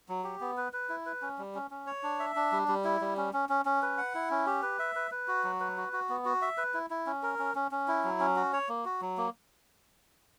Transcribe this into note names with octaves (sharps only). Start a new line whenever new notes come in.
F#3
G4
B3
B4
B4
E4
B4
C#4
G3
C#4
C#4
C#5
D4
E5
D4
G3
G3
E4
G3
C#4
C#4
C#4
C#4
B4
F#5
E4
C#4
G4
B4
E5
B4
B4
F#4
F#3
B4
F#4
F#4
B3
F#4
E5
B4
E4
E4
C#4
A#4
C#4
C#4
C#4
E4
F#3
C#4
F#4
C#5
A#3
F#4
F#3
A#3